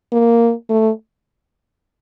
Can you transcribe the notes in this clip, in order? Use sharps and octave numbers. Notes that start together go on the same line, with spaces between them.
A#3
A3